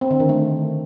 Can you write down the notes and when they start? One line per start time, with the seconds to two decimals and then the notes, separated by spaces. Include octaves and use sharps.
0.01 C4
0.11 D3
0.20 D#3
0.29 A3